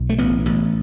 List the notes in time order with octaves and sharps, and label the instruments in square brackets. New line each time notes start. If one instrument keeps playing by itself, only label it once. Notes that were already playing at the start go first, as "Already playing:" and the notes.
Already playing: [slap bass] B1
A3
A1 B3
A1